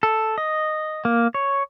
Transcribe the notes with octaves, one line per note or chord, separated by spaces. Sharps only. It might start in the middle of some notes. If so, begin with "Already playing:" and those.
A4
D#5
A#3
C#5